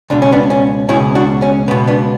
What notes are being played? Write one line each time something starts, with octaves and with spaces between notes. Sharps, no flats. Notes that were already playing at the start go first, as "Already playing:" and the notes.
C#2 B2 D4
C#4
B3 D4
C#4
C#2 B2 C#4 E4
D4 F#4
C#4
C#2 B2 B3
B3 D4